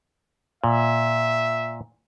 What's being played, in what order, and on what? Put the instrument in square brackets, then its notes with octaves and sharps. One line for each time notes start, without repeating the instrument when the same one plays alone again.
[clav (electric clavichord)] A#2 [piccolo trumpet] E5